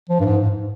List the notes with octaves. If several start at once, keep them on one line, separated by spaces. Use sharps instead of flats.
F3
G2
G#2
G#2